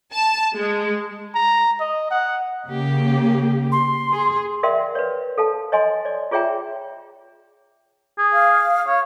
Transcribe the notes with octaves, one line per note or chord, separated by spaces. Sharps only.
A5
G#3
A#5
D#5
F#5
C#3 A#3 G4
C6
G#4
A#4 D5 E5 F5 G5 C6
B4 C#5
A4 F5 A5
C#5 D#5 G#5 C6
C#5 D5
F4 G#4 C#5 E5 G5 A#5
G#4
F5
C#5